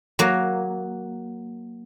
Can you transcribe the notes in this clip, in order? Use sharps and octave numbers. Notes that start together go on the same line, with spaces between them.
F#3 A#3